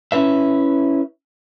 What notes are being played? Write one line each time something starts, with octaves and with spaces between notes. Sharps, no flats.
C#4 E4 B4 E5